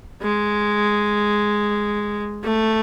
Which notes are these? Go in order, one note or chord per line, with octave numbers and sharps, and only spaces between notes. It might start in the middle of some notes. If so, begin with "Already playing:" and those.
G#3
A3